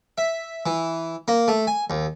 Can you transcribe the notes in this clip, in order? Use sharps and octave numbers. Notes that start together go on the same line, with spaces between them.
E5
E3
A#3
A3
G#5
D#2